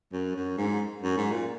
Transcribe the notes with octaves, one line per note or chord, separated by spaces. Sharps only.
F#2
F#2
G#2
F#2
G#2
A#2